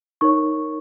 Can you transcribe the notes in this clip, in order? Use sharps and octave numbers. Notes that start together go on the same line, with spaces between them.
D#4 A#4 C#5 C#6